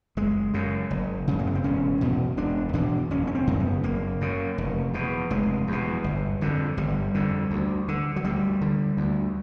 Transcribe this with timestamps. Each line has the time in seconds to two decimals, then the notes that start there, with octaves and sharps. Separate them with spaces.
0.17 F#1 G#3
0.54 F#2 C#3
0.91 F#1
1.27 F#2 C#3
1.39 A#3
1.47 B3
1.55 C4
1.64 E1 C#4
2.01 E2 B2
2.37 E1 D4
2.73 E2 B2 D4
3.11 F#1 C#4
3.27 C#4
3.35 C4
3.47 F#2 C#3
3.60 B3
3.83 F#1 A#3
4.21 F#2 C#3
4.58 F1
4.94 E2 B2
5.30 F1 G#3
5.67 E2 B2
6.04 G1
6.41 F2 D3
6.77 G1 G3
7.14 F2 D3
7.51 D2
7.88 D3
8.16 F#3
8.24 D2 G3
8.61 D3
8.97 D2